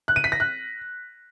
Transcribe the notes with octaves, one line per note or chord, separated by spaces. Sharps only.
F#6
D#7
B6
A#6
F#6